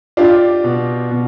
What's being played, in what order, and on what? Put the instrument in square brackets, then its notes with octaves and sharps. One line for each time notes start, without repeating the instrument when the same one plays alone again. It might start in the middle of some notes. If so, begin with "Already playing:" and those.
[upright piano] D4 F4 [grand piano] G4
[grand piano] B2
B2